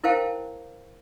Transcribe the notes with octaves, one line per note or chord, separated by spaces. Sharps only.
E4 A#4 C5 F5 G5 A5